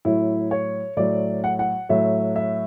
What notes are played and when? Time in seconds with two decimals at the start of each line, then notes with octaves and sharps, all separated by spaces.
0.05 A2 F#3 E4
0.51 C#5
0.97 A2 F#3 D5
1.44 F#5
1.59 F#5
1.89 A2 F#3 E5
2.36 E5